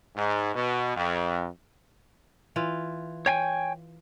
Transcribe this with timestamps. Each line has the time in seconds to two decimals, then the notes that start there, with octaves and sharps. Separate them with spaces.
0.16 G#2
0.55 B2
0.96 F2
2.56 E3 F4
3.26 C#5 G5 G#5